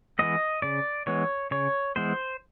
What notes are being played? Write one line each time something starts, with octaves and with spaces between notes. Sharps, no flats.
E3 G#3 B3 D#5
C#3 D5
E3 G#3 B3 C#5
C#3 C#5
E3 G#3 B3 C5